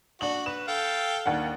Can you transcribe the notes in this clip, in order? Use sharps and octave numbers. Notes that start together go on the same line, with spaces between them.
D4 F#4 F#7
B4 E7
A4 F5 G5
D#2 D4 F#5